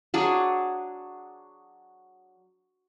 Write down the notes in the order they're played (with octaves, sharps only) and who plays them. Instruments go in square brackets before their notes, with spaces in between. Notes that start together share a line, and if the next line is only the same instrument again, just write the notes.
[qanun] F#3 D4 G#4